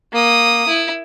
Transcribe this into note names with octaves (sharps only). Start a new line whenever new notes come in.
A#3 D#6
E4